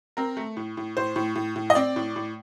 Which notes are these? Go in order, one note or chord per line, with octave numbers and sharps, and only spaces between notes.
C4 A#4
A3
A2
A2
A2 C5
A2
A2
A2
D#5
C4 D5
A2
A2